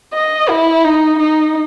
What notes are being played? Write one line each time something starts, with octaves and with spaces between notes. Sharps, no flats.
D#5
E4
D#4
D#4